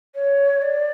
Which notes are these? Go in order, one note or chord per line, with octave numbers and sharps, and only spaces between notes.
C#5
D5